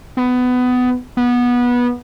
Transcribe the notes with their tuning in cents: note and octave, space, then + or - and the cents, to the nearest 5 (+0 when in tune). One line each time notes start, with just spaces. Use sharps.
B3 +20
B3 -20